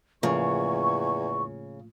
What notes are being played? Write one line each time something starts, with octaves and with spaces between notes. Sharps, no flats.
E2 A2 C#3 F3 A#3 C#6